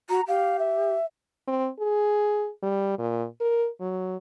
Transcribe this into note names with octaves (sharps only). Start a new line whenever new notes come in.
F#4 A#5
G4 F5
E5
C4
G#4
G3
A#2
A#4
F#3